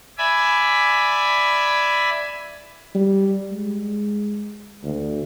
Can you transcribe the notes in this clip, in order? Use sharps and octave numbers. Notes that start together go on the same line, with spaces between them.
D5 E5 G#5 B5
G3
G#3
D2